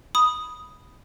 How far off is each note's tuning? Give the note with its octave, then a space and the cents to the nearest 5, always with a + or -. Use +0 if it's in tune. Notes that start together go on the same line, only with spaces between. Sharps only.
B5 +0 D#6 +0